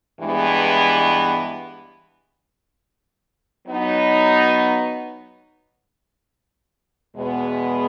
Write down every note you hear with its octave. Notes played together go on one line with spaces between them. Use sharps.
G2 E3 G#3 B3
F#3 B3 D#4
E2 B2 G#3 B3